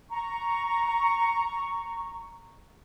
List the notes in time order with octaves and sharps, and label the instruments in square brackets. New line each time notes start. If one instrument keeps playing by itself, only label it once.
[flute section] A#5 C#6